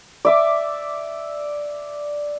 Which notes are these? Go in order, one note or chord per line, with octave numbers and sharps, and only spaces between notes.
D5 E5 D6